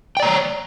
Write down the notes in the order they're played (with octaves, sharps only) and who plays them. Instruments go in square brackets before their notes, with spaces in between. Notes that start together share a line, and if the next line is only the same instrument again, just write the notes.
[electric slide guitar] G5
D5
A#5
C#5